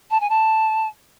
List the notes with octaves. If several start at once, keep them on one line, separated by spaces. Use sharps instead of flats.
A5
G#5
A5